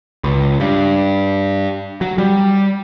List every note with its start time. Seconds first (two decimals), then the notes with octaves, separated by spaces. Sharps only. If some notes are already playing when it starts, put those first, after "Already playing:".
0.24 C#2
0.60 G2
2.01 F#3
2.18 G3